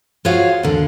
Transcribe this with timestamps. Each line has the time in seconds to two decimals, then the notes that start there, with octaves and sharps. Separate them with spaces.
0.25 F4 F#4 G#4 C5 C#5 F5
0.63 D#2 D3